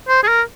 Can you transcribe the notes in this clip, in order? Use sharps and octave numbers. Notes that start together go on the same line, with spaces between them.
C5
G#4
A#4